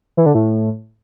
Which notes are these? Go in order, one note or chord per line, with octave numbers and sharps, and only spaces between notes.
E3
D3
A2